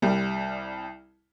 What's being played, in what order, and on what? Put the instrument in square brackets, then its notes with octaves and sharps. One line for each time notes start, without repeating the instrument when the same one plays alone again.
[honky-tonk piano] C2 G3